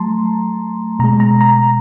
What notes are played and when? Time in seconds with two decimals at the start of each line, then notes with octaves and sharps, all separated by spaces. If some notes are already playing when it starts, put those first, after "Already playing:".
Already playing: F#3 A3 A5 A#5 C6
0.99 B2 A#5
1.04 G#3
1.20 A#5
1.41 A#5